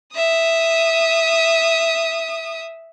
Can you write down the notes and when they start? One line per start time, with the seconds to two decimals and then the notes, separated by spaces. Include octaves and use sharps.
0.15 E5 D#6